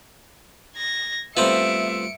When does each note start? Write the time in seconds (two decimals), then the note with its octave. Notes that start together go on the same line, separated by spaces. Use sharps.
0.76 G#6 A#6
1.37 G3 A3 B3 C4 F4 E5 C#7 D7